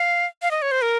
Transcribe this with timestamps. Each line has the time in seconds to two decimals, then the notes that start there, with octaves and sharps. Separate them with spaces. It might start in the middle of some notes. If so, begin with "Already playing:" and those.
Already playing: F5
0.42 F5
0.51 D#5
0.62 C#5
0.71 C5
0.82 A#4